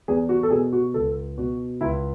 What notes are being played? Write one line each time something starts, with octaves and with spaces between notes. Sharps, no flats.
E2 G#4
F#4
A4
B2 G#4
F#4
C#2 A4
B2 F#4
C#2 E4